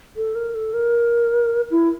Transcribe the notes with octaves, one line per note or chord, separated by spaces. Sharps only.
A4
A#4
A4
A#4
E4